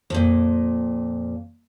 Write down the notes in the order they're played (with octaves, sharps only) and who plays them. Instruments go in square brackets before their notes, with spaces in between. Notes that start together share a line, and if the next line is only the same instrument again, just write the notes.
[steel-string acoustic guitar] F2 A#2